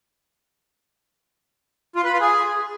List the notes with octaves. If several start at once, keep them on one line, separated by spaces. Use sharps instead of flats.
F4
B4
F4
G#4